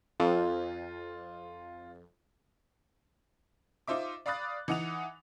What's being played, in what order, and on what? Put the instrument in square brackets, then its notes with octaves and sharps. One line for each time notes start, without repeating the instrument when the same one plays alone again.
[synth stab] F2 [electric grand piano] F4
[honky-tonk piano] D#4 F4 C5 E5 D6
D5 F5 B5 D#6 F#6 A6
E3 D#4 F#5 D#6 F7